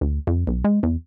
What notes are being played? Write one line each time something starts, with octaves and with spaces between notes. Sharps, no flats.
D2
F2
B1
G#3
E2